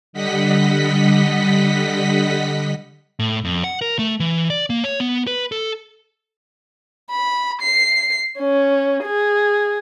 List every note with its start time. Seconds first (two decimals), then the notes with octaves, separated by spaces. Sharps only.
0.13 D3 G3 D#5 F#5 B6
3.19 A2
3.45 F2
3.64 F#5
3.82 A#4
3.99 A3
4.20 E3
4.50 D5
4.70 A#3
4.84 C#5
5.00 B3
5.27 B4
5.52 A4
7.11 B5
7.61 C7
8.39 C#4
9.04 G#4